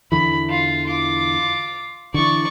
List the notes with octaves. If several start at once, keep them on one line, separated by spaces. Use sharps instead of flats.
E2 D3 E3 B5
F4
F4 D6
D3 E3 D5 C#6